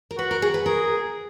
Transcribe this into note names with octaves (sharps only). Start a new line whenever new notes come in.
A#4
F#4 B4
A#4
G#4
B4
G#4 A#4